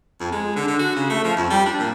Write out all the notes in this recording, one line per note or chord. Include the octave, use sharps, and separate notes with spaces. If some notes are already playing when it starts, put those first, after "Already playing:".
F2
G#3
D3
D3
F#4
C#3
A3
F3
F2
G3
D4
A#2